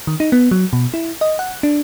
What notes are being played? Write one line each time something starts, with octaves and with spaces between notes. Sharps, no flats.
D#3
D#4
B3
F#3
B2
E4
D#5
F#5
D4